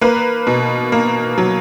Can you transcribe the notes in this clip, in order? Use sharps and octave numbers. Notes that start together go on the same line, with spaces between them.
A#3 B4
B2
A#3
F#3